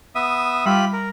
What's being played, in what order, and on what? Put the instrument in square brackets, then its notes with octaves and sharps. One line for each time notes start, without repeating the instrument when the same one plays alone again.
[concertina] B3 E5 D#6
[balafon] G3 [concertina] F4 G4 B5
[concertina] A#4